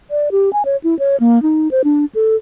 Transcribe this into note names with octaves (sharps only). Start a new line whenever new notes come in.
D5
G4
G#5
C#5
E4
C#5
A#3
D#4
C5
D4
A4